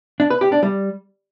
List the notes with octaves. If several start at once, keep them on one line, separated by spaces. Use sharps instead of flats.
D4
B4
G4
D4
G3